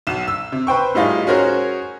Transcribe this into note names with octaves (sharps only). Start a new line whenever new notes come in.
B1 E7
E6
C3
B4 C5 G5 C#6
A2 G3 D#4 F4 G#4
C#4 F#4 G#4 A#4 C5 C#5